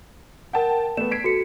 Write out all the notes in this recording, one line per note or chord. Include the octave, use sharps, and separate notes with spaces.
A#4 F#5 G5 A5
A3 B3 E7
G#6 B6 C7 D7
F#4 A4 C#7